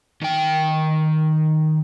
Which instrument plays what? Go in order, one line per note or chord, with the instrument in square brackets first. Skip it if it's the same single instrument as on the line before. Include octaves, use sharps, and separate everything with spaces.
[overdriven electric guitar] D#3 G5